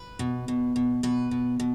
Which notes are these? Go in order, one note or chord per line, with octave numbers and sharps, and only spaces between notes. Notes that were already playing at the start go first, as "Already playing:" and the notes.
Already playing: B4
B2
B2
B2
B2 B4
B2
B2